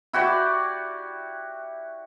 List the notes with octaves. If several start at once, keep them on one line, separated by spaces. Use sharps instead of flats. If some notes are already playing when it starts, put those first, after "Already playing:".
E4 F#4 G4 D5